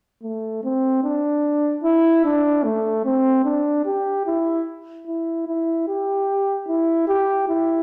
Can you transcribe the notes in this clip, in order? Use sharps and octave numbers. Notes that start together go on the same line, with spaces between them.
A3
C4
D4
E4
D4
A3
C4
D4
G4
E4
E4
E4
G4
E4
G4
E4